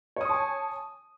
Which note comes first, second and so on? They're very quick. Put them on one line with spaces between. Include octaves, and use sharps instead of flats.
C#5 D#6 C#6 A5 G#5